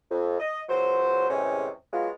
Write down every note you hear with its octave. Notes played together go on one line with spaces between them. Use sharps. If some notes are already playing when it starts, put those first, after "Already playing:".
F2
D#5
C#2 F#3 F#4 C5
E2 A2 C3 G#3 C4 C#4
F#3 G#3 B3 F4